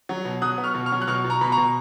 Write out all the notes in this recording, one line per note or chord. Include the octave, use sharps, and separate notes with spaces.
F#3
B2
F#3 D#6 F#6
B3
C#6 F6
B2
C#6 F6
F#3
F#6
B2 C#6 F6
B2
A#5 C#6
B2 B5
A#5 C#6
B2